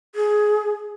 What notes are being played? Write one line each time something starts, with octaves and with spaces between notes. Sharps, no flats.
G#4